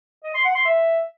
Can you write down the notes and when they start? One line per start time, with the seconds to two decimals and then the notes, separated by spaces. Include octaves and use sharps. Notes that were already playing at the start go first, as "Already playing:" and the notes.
0.24 D#5
0.34 C6
0.44 F#5
0.55 C6
0.65 E5